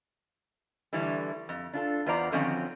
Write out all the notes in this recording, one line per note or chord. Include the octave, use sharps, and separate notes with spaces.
D3 E3 G3 A3
F2
D4 F4 A4
E2 B3 F4 C5 D5 A#5
D3 D#3 F3 F#3 C4 C#4